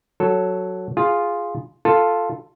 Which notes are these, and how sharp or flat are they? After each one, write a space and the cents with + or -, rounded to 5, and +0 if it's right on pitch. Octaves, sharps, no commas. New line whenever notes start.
F#3 +0 A4 +0
F4 +0 G#4 +0
F4 +0 A4 +0